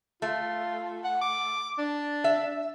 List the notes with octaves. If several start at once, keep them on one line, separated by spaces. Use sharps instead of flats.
A3 F4
F#5
D6
D4
E5